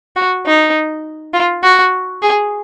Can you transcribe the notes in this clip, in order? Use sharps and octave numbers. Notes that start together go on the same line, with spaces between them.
F#4
D#4
F4
F#4
G#4